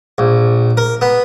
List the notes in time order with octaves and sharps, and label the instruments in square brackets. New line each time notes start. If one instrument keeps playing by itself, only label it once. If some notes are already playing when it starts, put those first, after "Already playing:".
[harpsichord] A#1
A#4
B3